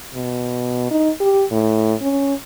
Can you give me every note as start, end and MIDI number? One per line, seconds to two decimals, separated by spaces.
0.15 0.88 47
0.91 1.10 63
1.20 1.44 67
1.51 1.94 45
2.02 2.34 61